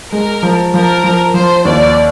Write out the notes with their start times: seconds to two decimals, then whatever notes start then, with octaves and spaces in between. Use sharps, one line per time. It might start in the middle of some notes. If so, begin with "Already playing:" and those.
0.12 G#3 A#4
0.43 F3
0.73 F3 A#4
1.04 F3
1.34 F3 C5
1.65 D#2 D5